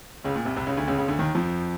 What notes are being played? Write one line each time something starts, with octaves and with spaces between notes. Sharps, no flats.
C#2 C#3
A#2
C2 C3
C2 C3
C#2 C#3
D2 D3
C#2 C#3
C#2 C#3
D2 D3
D#2 D#3
F2 F3